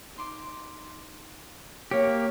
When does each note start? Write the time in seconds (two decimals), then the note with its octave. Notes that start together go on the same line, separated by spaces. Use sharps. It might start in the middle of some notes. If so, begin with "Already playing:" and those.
0.16 D#4 C6 D6
1.91 A#3 G4 C#5